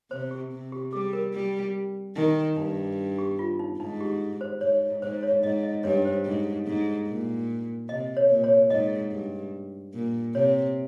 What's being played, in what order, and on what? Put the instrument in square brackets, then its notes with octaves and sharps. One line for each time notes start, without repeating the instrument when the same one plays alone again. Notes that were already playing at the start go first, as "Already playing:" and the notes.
[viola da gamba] C3 [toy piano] C5
[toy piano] G4
[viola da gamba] C3
[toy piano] G4
[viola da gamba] G3 [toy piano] G#4
[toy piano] A#4
[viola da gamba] G3
[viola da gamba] D#3 [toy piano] D#4
[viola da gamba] G2 [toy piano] D#4
[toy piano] G4
F4
D#4
[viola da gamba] G#2 [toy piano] D#4
[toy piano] G4
C5
[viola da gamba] G#2 [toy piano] C#5
[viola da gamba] G#2 [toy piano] C5
[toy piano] C#5
[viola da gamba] G#2 [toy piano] D#5
[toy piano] D#5
[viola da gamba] G2 [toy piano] C#5
[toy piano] C5
[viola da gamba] G#2
G#2
A#2
[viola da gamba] C3 [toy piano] D#5
[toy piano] C#5
[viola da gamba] A#2
[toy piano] C#5
[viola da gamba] G#2 [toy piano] D#5
[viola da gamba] G2
A#2
[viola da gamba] C3 [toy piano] C#5